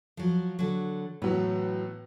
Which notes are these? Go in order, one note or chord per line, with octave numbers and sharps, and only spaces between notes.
F3 F#3
D3 F#3
A2 E3 F#3 B3